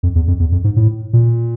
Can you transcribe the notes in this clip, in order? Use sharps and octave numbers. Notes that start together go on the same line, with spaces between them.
F2
E2
F2
E2
F2
G#2
A2
A#2